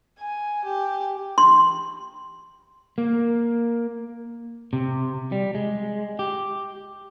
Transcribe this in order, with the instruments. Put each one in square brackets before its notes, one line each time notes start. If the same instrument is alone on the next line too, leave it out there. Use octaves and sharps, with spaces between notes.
[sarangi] G#5
G4
[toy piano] C6
[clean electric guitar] A#3
C3
G3
G#3
G4